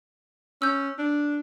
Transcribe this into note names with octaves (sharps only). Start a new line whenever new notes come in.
C#4 E6 G6
D4